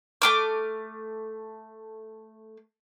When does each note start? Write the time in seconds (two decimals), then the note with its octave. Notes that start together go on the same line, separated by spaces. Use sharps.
0.22 A3 D6 F6